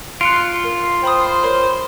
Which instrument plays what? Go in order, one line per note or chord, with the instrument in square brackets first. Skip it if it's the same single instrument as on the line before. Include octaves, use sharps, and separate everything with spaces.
[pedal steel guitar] F4 [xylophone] F#6 C#7 D7
[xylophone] A#4
[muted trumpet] C5 [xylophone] G5 B5 D#6
[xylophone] A#4 C#5 B5